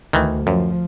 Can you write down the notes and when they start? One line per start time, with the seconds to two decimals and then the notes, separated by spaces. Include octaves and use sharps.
0.13 D2 D#3 E3
0.47 F#2 F3